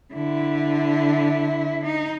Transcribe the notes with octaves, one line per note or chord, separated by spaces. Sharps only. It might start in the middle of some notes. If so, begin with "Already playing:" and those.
D3 E4
D#4